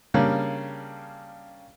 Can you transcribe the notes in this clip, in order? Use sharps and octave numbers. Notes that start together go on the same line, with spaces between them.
C#3 G3 A#3 C#4 D4